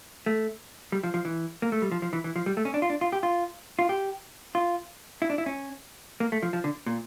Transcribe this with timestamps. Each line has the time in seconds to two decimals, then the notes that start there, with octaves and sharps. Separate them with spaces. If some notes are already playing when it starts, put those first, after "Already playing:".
0.26 A3
0.92 G3
1.03 F3
1.14 F3
1.25 E3
1.62 A#3
1.72 A3
1.82 G3
1.91 F3
2.02 F3
2.13 E3
2.24 E3
2.36 F3
2.46 G3
2.57 A3
2.65 C#4
2.74 D4
2.82 F4
2.90 D4
3.01 F4
3.12 G4
3.23 F4
3.79 F4
3.89 G4
4.55 F4
5.22 E4
5.30 D4
5.38 E4
5.46 C#4
6.20 A#3
6.32 A3
6.42 F3
6.53 F3
6.64 D3
6.86 A#2